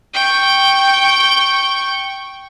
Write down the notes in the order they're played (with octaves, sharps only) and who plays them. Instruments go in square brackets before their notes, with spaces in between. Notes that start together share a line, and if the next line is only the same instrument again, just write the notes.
[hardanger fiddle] G5 C#6